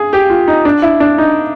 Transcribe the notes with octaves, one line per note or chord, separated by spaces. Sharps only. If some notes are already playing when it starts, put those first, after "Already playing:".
Already playing: G#4
G4
F4
D#4
D4
E4
D4
D#4